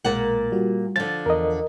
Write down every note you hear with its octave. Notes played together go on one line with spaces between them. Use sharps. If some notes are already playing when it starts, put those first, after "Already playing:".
B1 A#2 G#3 A#3 F#5 A6
G3 F4 F#4
D3 F3 A6
E2 A#4 D#5